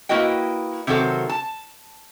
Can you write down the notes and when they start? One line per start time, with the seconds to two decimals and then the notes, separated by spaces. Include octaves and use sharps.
0.09 A#3 E4 F#4 B4 D#5 G5
0.87 C3 D#3 F#3 F#4 A4 C5
1.29 A5